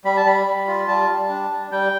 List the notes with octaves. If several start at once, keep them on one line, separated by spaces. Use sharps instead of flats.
G3 B5
A5
G3 B5
G3
F4
G3 A5
G3
D4
G3
G3 G5